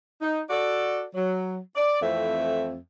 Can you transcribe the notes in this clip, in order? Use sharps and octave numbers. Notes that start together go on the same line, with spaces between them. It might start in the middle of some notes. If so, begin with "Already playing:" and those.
D#4
F#4 A4 D5
F#3
D5
F2 E3 A3 C4 E4 E5